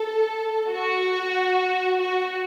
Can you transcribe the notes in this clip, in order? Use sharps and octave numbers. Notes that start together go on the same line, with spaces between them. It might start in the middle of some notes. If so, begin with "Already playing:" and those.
Already playing: A4
F#4
F#4